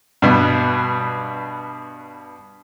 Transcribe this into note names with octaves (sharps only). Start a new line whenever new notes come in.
G2 B2